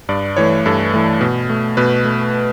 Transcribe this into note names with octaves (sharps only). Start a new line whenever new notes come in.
G2 D5
E3 A3 C#5
G2 A4
E3 A3
B2
A3
B2 B4
A3